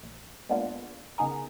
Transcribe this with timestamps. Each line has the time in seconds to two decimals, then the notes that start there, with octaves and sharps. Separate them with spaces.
0.03 A#1
0.49 G#3 A#3 B3 D4 F4
1.18 C#3 B3 D#4 G#4 A#4